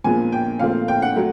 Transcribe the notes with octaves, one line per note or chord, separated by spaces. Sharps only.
A#2 F3 G#3 B3 G#5
G5
A#2 F3 A3 C4 F5
G5
F#5
F#3 A3